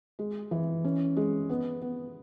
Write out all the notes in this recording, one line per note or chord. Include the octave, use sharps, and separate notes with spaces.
G#3
E3
C#4
G#3
B3
B3